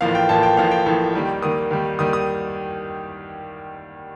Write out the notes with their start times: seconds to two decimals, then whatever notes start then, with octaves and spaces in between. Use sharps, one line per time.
0.01 A1 A2 F3 A#3 F5
0.15 G5
0.29 A1 A2 F3 A#3 A5
0.43 G5
0.57 A1 A2 F3 A#3 F5
0.71 G5
0.86 A1 A2 F3 A#3
1.14 D#2 D#3 G3 A#3
1.42 D#2 D#3 G3 A#3 D#6
1.71 D#2 D#3 G3 A#3
1.99 D#2 D#3 G3 A#3 D#6
2.13 D#6